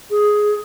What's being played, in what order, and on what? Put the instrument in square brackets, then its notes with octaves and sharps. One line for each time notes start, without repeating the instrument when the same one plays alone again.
[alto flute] G#4